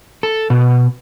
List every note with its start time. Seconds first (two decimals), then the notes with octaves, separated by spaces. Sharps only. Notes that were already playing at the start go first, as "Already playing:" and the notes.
0.23 A4
0.50 B2